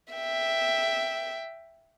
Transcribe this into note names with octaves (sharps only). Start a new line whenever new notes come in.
E5 G5